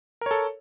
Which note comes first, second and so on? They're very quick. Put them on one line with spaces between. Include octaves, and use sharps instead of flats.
A#4 C#5 A4